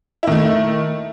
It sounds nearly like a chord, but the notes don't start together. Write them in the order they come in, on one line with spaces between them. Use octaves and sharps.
E4 D#3 A3